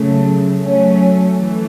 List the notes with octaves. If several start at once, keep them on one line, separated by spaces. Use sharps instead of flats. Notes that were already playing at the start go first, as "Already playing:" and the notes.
Already playing: C#3 F#3 A3
F#3 A3 C#4
E3 A3